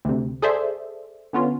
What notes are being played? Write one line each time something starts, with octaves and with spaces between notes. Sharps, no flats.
D2 C3
G#4 A4 C5 D5 E5
D3 B3 C#4 F4